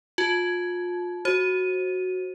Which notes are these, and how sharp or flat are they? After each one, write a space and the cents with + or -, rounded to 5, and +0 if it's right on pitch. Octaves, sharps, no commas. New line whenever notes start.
F4 +30 A5 -25
F#4 +0 C5 +25